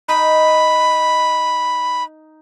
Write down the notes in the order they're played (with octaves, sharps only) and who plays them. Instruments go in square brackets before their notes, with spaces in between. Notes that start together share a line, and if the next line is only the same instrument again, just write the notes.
[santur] D#4 [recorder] B5